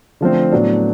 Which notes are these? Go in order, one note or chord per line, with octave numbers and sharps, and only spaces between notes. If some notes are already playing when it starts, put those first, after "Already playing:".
D3 F3 A3 C4
A2 F#3 B3 D4